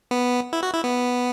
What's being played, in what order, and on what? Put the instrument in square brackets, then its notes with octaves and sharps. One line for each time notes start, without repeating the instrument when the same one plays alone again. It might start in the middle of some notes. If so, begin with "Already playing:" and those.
[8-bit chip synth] B3
E4
F#4
E4
B3